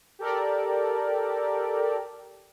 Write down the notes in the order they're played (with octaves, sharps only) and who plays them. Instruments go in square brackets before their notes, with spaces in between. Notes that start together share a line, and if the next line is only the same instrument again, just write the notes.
[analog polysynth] G4 A4 A#4 D5